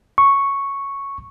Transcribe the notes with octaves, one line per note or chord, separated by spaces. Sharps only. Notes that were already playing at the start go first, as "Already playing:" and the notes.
C#6